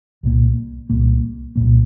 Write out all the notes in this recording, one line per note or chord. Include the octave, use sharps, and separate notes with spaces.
C2 A#2 A#3
C2 A#2 A#3
C2 A#2 A#3